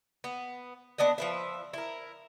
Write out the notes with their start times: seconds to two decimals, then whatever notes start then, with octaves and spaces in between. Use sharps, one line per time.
0.24 B3
0.98 B3 D4 D#5 F#5
1.18 F3 B4 E5
1.73 E4 A#4